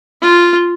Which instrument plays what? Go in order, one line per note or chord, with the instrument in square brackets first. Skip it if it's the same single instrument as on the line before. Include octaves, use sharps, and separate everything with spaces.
[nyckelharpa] F4